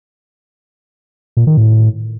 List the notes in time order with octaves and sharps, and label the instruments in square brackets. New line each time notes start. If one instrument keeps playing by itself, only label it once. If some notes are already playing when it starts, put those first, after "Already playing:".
[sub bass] A#2
D#3
A2